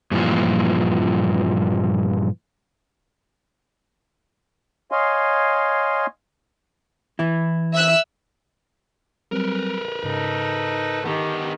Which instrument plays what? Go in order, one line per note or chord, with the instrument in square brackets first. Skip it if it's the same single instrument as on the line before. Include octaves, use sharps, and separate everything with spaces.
[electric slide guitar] G2 A#2 E3 F3
[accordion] C#5 D#5 F5 G#5 C6
[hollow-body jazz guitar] E3 E4
[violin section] E5 E6 F#6
[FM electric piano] F#3 G3 C4 [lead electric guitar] A#4 B4
[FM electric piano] G#2 C#3 [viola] D#4 A4
[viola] D#3 [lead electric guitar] B3 G4